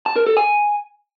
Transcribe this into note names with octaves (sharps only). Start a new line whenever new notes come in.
A5
A#4
A4
G#5